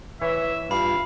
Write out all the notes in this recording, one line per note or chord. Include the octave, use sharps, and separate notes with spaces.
E3 B4 C#5 E5
G2 F4 F5 B5